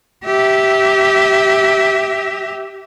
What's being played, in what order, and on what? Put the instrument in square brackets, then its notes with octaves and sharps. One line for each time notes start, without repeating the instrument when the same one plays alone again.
[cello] G4 E5